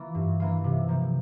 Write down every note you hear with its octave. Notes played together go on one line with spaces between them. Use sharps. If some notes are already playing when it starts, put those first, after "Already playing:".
Already playing: E3 A#3 F4
G2
E3 A#3 F4
C3
F3 A#3